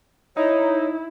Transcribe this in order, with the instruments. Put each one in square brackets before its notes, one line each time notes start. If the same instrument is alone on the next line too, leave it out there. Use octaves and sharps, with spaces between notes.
[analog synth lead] D#4 [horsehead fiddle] E4 [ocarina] C#5